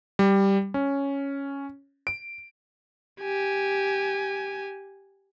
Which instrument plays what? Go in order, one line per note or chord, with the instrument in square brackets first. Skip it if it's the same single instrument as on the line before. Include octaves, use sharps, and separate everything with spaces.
[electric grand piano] G3
C#4
D7
[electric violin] G4 G#5